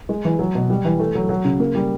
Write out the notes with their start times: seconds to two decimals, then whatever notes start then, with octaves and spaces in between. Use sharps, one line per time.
0.09 G#3
0.25 E3
0.39 F#3
0.55 B2
0.70 G3
0.85 E3
1.00 A3
1.15 F#3
1.29 F#3
1.45 C#3
1.60 A#3
1.75 G3